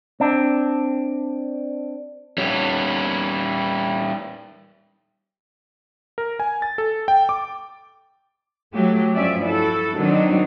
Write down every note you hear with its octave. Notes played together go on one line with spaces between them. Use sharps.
C4 D4
G3 C#4
A#4
G#5
A6
A4
G5
D6
F#3 A3 G4
G2 F3 C#4 D5 E5
E4 F#4 A4
D#3 F#3 C4 D4 D#4